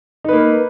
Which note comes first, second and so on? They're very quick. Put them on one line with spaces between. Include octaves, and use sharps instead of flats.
D#4 B4 A#3